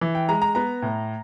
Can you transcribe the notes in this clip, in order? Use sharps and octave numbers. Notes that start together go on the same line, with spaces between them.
E3
G5
G#3 A#5
A#5
B3 A#5
A2